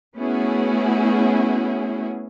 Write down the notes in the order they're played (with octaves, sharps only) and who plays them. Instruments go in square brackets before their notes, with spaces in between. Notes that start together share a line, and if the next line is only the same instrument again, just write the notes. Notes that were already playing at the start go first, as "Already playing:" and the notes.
[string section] A3 B3 C#4 E4 F#4 G#4